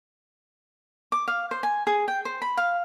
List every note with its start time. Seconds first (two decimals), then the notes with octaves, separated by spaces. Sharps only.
1.12 D6
1.28 F5
1.51 C5
1.63 G#5
1.87 G#4
2.08 G5
2.25 C5
2.42 B5
2.57 F5